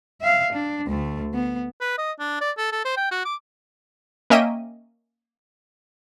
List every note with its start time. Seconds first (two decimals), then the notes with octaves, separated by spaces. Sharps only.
0.21 E5 F5
0.52 D4
0.87 D2 A3
1.34 B3
1.81 B4
1.98 D#5
2.20 D4
2.41 D5
2.58 A4
2.72 A4
2.85 C5
2.97 G5
3.11 F#4
3.25 D6
4.30 A#3 C#4 D#5 E5 G5 D#7